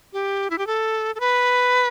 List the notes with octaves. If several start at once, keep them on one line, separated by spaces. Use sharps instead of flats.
G4
E4
G4
A4
A4
B4